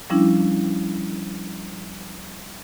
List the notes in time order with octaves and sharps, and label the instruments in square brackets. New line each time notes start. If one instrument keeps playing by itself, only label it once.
[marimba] F3 G3 C#4 D4 E4